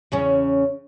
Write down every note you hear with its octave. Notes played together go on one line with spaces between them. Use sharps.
E2 C#3 C#4